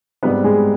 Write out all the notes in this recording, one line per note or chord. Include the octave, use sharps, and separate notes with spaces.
G#2 G3 B3 C4 B4
G#3 G#4